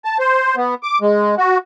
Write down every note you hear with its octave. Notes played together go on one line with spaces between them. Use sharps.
A5
C5
B3
D6
G#3
F#4